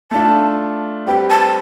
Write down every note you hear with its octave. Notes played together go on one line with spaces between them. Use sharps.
A3 D4 F4 A5
G3 C4 G4 B4 G5
A5